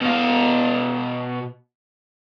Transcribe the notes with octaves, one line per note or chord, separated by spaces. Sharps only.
B2 F5